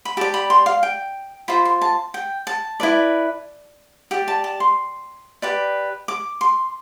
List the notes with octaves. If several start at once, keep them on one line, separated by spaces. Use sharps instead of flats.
B5
G4 D5 A5
B5
C6
F5
G5
F4 C5 B5
C6
A5
G5
A5
E4 B4 D5
G4 D5 G5
A5
A5
C6
G4 B4 D5
D6
C6